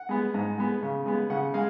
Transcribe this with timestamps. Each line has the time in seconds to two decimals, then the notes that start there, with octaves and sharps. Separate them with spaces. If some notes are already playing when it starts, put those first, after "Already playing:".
Already playing: F#5
0.09 G#3 B3
0.34 G#2
0.58 G#3 B3
0.83 C#3
1.06 G#3 B3
1.30 C#3 F#5
1.54 G#3 F5